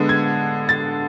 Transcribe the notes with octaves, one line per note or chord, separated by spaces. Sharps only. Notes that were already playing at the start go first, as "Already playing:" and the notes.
Already playing: D3 G#3 B3
G#6
A6